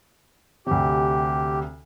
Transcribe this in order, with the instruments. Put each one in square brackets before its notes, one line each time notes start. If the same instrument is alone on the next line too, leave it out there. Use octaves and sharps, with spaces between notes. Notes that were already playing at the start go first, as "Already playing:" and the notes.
[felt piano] D2 C3 [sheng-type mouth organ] G4